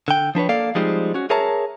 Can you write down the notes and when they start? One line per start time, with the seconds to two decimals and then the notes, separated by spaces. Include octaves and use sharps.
0.08 D3 G5
0.35 F3 D4 B4 C#5
0.49 A#3 A4 D5 F5
0.75 F3 G3 G#3 C4 D#4 F4
1.14 C#4 F#4
1.30 G#4 A#4 C#5 E5 A5 A#5